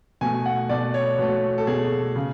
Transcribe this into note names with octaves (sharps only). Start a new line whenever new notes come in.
B2 A3 G#5
F#5
B2 A3 D5
C#5
B2 A3 F#4
A4
B2 A3 G#4
C#3